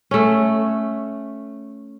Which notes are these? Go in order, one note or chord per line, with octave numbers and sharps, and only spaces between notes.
A3 C#4